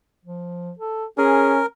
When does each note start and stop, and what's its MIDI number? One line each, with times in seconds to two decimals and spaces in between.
0.25 0.72 53
0.79 1.05 69
1.18 1.63 61
1.18 1.54 68
1.18 1.66 70